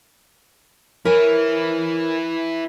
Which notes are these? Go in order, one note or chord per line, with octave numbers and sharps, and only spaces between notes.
E4 A#4 B4 C#5 G#5